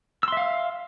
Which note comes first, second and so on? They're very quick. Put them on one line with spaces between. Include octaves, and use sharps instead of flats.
E6 C6 E5 F5